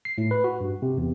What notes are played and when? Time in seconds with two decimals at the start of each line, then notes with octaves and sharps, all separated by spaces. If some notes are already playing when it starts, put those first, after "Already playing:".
0.05 C7
0.18 A2
0.31 B4
0.44 F#4
0.61 G2
0.82 C3
0.98 E2